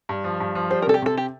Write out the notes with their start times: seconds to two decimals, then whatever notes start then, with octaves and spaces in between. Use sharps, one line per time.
0.09 G2
0.24 F3
0.40 G2
0.55 F3
0.71 G3 C5
0.82 A#4
0.87 C3 A4
0.94 G4
1.02 C3 A4
1.18 G4